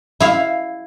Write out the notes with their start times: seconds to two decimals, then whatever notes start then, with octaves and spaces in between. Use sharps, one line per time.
0.20 E4 F5